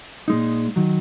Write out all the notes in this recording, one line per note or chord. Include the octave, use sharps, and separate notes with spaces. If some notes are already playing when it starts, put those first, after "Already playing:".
A#2 G#3 D#4
D#3 F#3